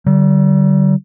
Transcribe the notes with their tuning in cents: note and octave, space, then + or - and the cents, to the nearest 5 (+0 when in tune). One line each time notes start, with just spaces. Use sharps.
D3 -5 G3 -40